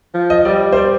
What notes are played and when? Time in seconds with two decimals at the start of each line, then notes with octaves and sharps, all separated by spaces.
0.14 F3
0.30 D#5
0.45 G3 D5
0.72 C5
0.77 D5